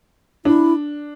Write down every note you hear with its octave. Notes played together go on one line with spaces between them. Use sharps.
D4 E4